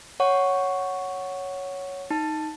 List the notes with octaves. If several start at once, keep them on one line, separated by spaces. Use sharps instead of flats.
C#5 F#5 C#6
D#4 A5